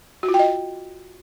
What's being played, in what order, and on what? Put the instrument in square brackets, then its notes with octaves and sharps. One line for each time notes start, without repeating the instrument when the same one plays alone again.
[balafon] F#4
F4
G5
D#5